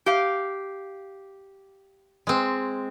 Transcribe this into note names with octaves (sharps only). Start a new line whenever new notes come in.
G4 F5
G#3 C4